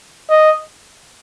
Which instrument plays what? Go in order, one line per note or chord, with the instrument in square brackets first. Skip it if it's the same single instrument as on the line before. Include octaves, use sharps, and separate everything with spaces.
[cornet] D#5